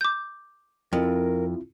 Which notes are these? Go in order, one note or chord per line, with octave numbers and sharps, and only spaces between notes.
D6 G6
F2 C4 E4 F4 A#4